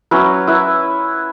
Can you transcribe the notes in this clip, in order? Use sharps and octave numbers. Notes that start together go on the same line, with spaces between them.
F#3 C#4 E4 B4
E4 B4 E5